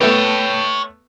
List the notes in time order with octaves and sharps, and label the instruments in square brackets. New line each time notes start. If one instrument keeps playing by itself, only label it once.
[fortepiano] A3 B3 [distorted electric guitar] C#5 G5